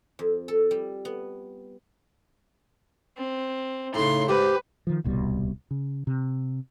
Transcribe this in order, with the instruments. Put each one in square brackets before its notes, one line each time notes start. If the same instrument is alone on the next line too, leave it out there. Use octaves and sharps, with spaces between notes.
[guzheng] F2
A4
G3
B3
[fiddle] C4
[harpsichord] A2 C#3 [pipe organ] D#4 [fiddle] C6
[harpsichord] G#2 [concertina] G4 [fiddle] B4 [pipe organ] C5
[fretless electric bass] D#3 F3
D1 C2 B2 G3
C#3
C3